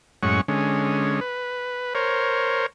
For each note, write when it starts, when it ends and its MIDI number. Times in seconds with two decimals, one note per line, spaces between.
0.23 0.41 42
0.23 0.41 45
0.23 0.41 56
0.23 0.41 61
0.23 0.41 78
0.23 0.41 85
0.48 1.20 50
0.48 1.20 56
0.48 1.20 61
1.21 1.94 71
1.95 2.66 70
1.95 2.66 72
1.95 2.66 73